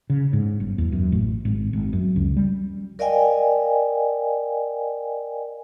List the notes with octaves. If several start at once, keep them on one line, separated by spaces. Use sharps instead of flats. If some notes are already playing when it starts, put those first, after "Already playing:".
C#3
G#2
G1
E2
F#2
A1
G#1
G#1
F#2
C#2
G3
A#4 D5 D#5 F5 G5 G#5